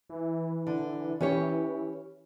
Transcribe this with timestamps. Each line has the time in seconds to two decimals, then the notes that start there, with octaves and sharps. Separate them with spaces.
0.10 E3
0.67 D3
1.21 E3 C#4 G4 C#5